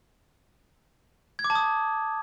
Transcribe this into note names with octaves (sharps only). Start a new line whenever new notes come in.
G#6
D6
A5
D#6